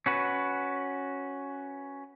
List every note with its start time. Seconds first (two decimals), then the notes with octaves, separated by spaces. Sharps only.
0.06 C#4 F#4 B4